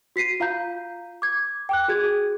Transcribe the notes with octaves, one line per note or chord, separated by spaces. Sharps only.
F#4 B6 C7 D#7
F4 F5 A#5 G6
D6 G#6
G5 D6 F#6
F#4 G#4 G#6